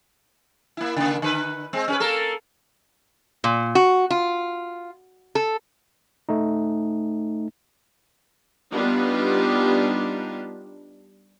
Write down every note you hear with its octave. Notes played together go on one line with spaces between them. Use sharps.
A#3 E4
C#3 A#3
D3 B4
G#3 C4
C#4 G#4 B4
A#3 A4 A#4
A#2
F#4
F4
A4
A3 D#4
G3 B3 D4 D#4 F4 G4